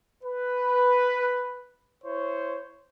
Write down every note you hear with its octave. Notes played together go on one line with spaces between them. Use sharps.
B4
E4 C5 C#5